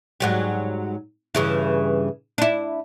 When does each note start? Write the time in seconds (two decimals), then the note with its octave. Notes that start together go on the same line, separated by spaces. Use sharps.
0.20 G#2 F#3 G3
1.35 G2 C#3 E3
2.38 D4 E4